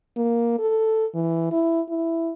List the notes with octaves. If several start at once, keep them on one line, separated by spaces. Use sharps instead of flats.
A#3
A4
E3
E4
E4